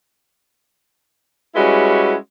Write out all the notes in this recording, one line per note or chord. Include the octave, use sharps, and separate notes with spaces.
G3 G#3 C#4 E4 F#4 B4